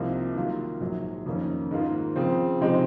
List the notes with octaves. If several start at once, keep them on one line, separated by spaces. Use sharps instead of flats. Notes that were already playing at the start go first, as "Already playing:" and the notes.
Already playing: C2 C3 F3 A#3 D#4
D#3 F#3 A#3 F4
A#1 G#2 F#3
F2 D#3 A#3 C#4
G#2 D#3 A#3 F4
C#3 F3 C4
C3 F3 G#3 C4 D#4